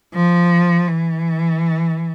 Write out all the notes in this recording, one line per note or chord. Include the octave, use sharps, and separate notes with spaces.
F3
E3